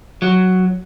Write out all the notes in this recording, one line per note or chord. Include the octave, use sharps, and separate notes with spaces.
F#3